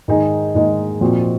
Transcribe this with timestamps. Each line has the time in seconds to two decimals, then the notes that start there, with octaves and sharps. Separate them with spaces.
0.08 G#2 D#3 G#3 D#4 G#4
0.55 G#2 D#3 G#3 D#4 G#4
1.01 A#2 F3 C4 F#4